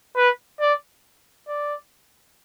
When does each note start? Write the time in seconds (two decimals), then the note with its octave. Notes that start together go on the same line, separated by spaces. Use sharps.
0.16 B4
0.60 D5
1.48 D5